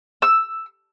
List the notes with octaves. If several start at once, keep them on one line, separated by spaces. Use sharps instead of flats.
E6